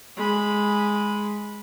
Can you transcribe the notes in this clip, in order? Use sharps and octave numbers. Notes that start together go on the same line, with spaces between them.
G#3 B5